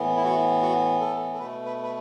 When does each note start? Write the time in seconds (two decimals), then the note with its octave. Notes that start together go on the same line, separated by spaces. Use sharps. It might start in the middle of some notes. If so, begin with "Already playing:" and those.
Already playing: A2 E3 B3
0.16 E4
0.24 F#4
0.62 F#4
1.01 A4
1.33 A4
1.39 B2 A3 B4
1.65 B4
1.83 B4